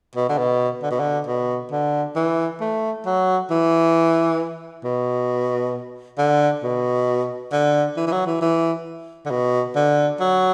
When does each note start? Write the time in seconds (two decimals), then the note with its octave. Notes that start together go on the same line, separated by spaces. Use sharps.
0.15 B2
0.29 D3
0.38 B2
0.82 D3
0.91 B2
1.00 D3
1.27 B2
1.72 D3
2.16 E3
2.61 A3
3.06 F#3
3.51 E3
4.84 B2
6.19 D3
6.63 B2
7.53 D3
7.97 E3
8.07 E3
8.12 F#3
8.26 E3
8.42 E3
9.26 D3
9.31 B2
9.76 D3
10.20 F#3